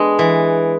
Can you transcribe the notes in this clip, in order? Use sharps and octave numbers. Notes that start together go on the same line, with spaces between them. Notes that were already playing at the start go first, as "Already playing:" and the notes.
Already playing: G#3 B3 D4
E3